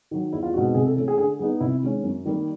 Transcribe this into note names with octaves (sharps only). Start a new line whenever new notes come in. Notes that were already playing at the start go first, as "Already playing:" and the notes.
D#3 F#3
E2 E4
F4
B2 G#3 C4 D#4 F#4
C3 G#4
A4
E3 A3 C#4 A4
G#4
D3 G#4
G3 B3 D#4 G#4
C3 E4
D#3 G#3 C#4
F#2
D#3 G3 A#3